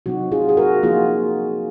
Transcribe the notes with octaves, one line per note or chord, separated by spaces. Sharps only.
C3 F#3 C4 D#4 F#4
F4 G#4
G#4
F#4 A#4
F3 A#3 D#4 F4 G#4